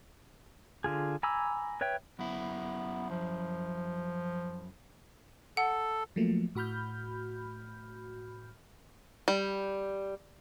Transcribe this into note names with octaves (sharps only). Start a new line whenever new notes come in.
D3 F4 G#4
G#5 A#5 B5 D6 E6
B4 C#5 E5 G5
F#2 B3 E4
F3
A4 F#5
F3 F#3 A3 A#3
A2 F#4 B5 F6 G6
G3